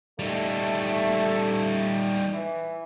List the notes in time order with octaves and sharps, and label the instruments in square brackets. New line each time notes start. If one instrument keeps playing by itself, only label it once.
[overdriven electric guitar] G3 D#4 [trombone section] A3
[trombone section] E3